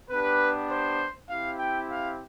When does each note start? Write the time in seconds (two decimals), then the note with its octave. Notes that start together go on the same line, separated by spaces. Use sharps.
0.10 B3 D4 G4 B4
0.70 C5
1.29 C4 E4 G4 F5
1.58 G5
1.89 F5